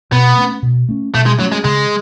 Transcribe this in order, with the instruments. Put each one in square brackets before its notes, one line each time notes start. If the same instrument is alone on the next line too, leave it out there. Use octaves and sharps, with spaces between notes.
[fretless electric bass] B2 [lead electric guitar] B3
[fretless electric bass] A3 C#4
B2
A3 C#4
[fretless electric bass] B2 [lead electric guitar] A3
[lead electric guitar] G#3
[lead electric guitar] F#3 [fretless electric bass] A3 C#4
[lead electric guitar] G#3
[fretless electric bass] C#3 [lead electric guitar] G#3